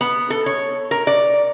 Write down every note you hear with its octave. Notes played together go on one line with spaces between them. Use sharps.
B3
A4
C#5
A#4
D5